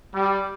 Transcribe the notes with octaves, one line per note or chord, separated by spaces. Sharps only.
G3